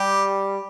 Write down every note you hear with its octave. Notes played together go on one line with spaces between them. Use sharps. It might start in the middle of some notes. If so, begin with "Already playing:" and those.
Already playing: G3 G4